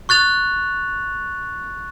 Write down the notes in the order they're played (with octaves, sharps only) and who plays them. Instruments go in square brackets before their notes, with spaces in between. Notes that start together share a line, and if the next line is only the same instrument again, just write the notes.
[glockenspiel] C#6 F#6 A6 F7